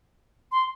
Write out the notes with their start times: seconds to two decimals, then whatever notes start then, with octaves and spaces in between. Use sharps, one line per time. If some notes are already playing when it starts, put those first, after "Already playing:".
0.52 C6